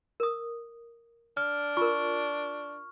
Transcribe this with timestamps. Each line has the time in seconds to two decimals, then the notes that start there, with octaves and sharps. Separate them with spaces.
0.20 A#4 D#6
1.37 D4 F6
1.77 F4 A#4 C#6